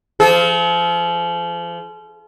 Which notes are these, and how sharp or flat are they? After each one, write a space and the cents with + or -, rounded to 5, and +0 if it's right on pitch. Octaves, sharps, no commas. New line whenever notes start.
F3 -30 A4 -45